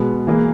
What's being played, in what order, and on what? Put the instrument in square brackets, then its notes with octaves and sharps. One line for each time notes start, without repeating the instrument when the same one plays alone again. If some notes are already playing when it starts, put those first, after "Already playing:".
Already playing: [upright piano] B2 G#3 B3
E3 A#3 E4 G#4